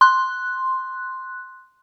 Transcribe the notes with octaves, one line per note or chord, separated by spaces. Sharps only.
C6 F#6